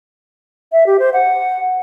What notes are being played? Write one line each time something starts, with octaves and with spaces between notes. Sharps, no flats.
E5
G4
C5
F#5